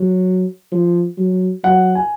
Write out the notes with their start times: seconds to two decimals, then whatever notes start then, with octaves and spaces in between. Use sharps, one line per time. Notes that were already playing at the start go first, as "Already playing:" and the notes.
Already playing: F#3
0.72 F3
1.18 F#3
1.64 F#3 F#5
1.95 G#5